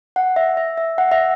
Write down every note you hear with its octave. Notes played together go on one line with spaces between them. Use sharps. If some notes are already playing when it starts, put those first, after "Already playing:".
F#5
E5
E5
E5
F#5
E5